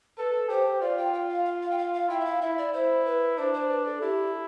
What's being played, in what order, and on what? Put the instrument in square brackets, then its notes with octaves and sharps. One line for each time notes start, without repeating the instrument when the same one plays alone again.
[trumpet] A4 [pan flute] B4
[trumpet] G4 [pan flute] C5
[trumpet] F4 [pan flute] D5
[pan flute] G5
G5
F5
F5
F5
G5
F5
F5
[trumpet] E4 [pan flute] G5
[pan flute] E5
F5
[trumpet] E4 [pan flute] E5
[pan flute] D5
[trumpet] E4 [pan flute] C5
[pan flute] B4
[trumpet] D4 [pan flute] C5
[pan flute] C5
B4
A4
[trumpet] E4 [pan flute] G4